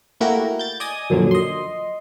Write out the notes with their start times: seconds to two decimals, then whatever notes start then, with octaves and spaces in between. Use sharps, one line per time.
0.20 A3 A#3 E4 F#4 G4 A#4
0.59 G6 A6
0.80 D5 D#5 G#5 D#6
1.10 F#2 A#2 D3 F3 F#3
1.31 D#5 C6